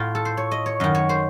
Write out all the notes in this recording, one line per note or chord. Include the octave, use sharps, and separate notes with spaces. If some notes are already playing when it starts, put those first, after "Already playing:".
Already playing: A2 F4
A4
C5
C#5
D#5
C#5
F#2 D#3 D#5
C#5
C5